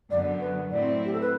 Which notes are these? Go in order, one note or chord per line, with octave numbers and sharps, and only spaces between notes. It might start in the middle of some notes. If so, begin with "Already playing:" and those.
F#2 D3 F#3 B3 D5
B4
A2 F#3 C4 E4 D5
G4
A4
B4